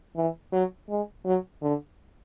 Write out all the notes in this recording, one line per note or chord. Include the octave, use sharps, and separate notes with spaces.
E3
F#3
G#3
F#3
D3